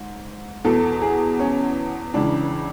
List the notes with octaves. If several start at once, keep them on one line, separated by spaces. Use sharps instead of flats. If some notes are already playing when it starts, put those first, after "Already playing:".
Already playing: G#2
E2 B2 A4
G#4
C#4
C#2 C#3 E3 D4